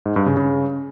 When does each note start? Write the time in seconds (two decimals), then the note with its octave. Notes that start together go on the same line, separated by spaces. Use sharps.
0.06 G#2
0.16 G2
0.26 C#3
0.37 C#3